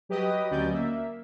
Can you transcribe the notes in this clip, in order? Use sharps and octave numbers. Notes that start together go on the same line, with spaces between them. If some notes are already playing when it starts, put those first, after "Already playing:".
F#3 G4 B4 D#5 D#6
D2 F#3 C#4 D5 D#5 G6
A#3 E5